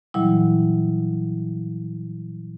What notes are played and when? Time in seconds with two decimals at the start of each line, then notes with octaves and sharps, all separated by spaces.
0.14 A#2 E3 F#3 G3 E4